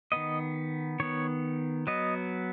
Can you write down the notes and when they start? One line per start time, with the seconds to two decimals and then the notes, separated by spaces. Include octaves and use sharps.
0.12 D#3 B3 D#5
1.00 D#3 B3 C#5
1.87 F#3 B3 D#5